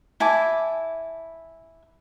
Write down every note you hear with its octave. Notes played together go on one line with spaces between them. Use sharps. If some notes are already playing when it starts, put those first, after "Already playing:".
E4 G#5 A5 D6